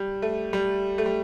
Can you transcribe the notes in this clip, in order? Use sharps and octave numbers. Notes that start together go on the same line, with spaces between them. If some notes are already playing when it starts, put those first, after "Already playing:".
Already playing: G3
A3
G3
A3
G3